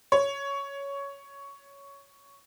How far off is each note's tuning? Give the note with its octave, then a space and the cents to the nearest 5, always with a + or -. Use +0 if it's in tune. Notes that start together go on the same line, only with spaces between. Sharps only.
C#5 +10